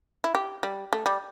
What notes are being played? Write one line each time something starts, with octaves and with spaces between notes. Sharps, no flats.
E4
G4
G3
A3
G3